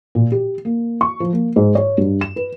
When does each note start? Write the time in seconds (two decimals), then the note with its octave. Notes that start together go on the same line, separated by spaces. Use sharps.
0.15 A#2
0.32 G4
0.65 A#3
1.01 C#6
1.20 F3
1.33 A#3
1.56 G#2
1.75 C#5
1.98 G2
2.21 E7
2.36 B4